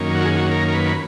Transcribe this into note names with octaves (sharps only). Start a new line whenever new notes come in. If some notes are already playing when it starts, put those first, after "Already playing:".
Already playing: F#2 D#3 A#3 C#4
F#4
G#4
F#4
A#4
A#4
B4